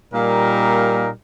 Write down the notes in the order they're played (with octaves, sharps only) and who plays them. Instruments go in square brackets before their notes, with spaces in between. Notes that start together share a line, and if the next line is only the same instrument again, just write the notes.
[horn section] A#2 G3 A#3 D#4 A#4